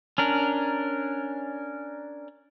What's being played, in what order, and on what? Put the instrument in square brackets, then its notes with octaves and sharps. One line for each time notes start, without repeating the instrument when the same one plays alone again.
[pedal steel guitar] C#4 D4 A#4